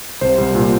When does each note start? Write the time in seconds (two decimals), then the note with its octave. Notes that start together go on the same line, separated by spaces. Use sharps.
0.21 C2 C5
0.38 C2
0.55 A#2